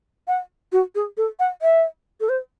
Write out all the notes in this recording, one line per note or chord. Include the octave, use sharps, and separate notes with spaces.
F#5
F#4
G#4
A4
F#5
E5
A4
C5